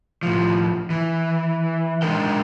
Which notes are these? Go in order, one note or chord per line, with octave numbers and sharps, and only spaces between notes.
A2 F3
E3
G#3 D4 D#4 A#4 G5